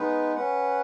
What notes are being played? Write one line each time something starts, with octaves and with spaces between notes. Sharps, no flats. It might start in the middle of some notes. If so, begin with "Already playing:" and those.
Already playing: G#3 B3 D#4 B4
C#4 B4 F#5